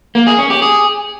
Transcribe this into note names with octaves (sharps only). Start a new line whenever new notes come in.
A#3
G#4
C#4
G4
G#4